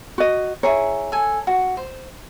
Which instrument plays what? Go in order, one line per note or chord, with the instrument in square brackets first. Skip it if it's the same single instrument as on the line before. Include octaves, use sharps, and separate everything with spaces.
[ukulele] F#4 D#5
[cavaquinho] E4 G#4 A#5 [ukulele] C#5
[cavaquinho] A4 G#5
F#4
C5